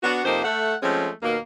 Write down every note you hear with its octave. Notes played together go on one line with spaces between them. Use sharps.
B3 D4 F#4
F2 C3 A#3 D#4 C5
A3 F#5
F3 G#3 A3 C4 C#4
D#2 B2 A#3